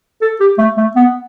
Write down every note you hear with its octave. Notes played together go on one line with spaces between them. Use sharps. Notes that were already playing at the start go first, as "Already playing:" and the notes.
A4
G4
A3
A3
B3